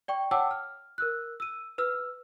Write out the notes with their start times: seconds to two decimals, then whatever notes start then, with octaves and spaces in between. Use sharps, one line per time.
0.08 D5 G5 C#6
0.31 C#5 F#5 G5 A5 D6 E6
0.51 F6
0.98 A#4 E6 F#6
1.40 E6 D#7
1.78 B4 E6 F6